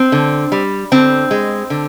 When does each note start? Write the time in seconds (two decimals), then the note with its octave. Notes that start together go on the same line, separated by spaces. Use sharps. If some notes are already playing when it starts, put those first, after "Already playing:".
Already playing: C4
0.12 D3
0.52 G3
0.92 D3 C4
1.31 G#3
1.70 D3